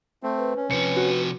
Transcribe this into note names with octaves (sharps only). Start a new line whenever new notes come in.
A3 C4
B4
C#4
C3 F3 B4 C#7
F#4